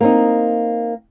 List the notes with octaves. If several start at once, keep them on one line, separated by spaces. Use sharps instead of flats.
A#3 C4 D#4